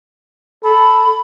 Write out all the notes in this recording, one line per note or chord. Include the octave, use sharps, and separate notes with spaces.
A4 B5